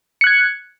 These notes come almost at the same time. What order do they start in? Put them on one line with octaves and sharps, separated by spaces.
C#7 F#6 G#6